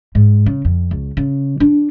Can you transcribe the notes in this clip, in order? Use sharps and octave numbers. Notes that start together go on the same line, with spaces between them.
G#2
C#3
F2
C#2
C#3
D4